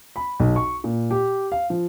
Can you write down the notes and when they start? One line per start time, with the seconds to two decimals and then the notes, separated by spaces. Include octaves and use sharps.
0.16 B5
0.40 B1
0.56 C#6
0.84 A#2
1.11 G4
1.52 F5
1.70 F3